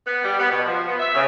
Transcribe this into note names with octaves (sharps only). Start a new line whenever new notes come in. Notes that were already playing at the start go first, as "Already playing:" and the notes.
B3
G3
B3
B2
F3
B3
E5
C#3